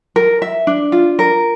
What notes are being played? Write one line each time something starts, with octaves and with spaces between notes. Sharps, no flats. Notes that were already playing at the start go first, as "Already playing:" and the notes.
A#4
E5
D4
F4
A#4